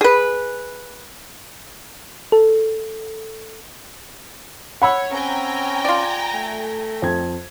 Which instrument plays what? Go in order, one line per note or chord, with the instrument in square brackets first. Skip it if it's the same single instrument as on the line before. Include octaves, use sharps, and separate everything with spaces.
[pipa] G#4 B4
[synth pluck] A4
[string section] C#5 [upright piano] F#5 B5 E6
[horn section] C4 C#4 [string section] G5 G#5 A#5
[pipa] F4 D5
[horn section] A3
[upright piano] F2 G#6